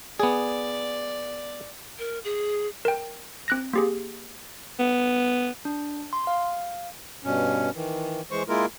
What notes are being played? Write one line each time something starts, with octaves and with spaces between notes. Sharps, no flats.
B3 G#4 D5
A#4
G#4
A#4 G5
C4 F#6 A#6
A#3 G4 G#4
B3
D4
C6
F5
G2 B2 C#4
D#3 E3
E3 G#3 C5 C#6
G#3 A#3 E4 F4 A#4